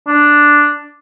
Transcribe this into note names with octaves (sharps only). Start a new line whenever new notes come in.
D4